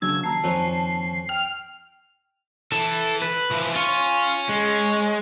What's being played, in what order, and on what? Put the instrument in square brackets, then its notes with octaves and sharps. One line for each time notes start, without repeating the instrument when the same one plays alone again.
[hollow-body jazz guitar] C#3 F#3 D4 [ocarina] E6 [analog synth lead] G#6
[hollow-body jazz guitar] D#2 A#5 [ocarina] A5 [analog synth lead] C7
[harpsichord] F2 C#4
[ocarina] G5 [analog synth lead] F6
[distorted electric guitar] E3 [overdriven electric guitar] A4
[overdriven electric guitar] B4
[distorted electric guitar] E3 F3
[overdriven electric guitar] F4 [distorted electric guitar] C#5 G#5
[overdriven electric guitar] G#3